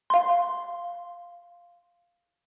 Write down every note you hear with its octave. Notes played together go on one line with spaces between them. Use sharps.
F5 C6